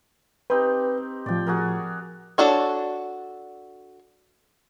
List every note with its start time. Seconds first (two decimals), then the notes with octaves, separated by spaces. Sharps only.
0.50 C4 D#4 G4 B4
1.26 A2 F3 D5 G5
1.47 F#4 G#4 A#4
2.38 D4 F#4 A4 C#5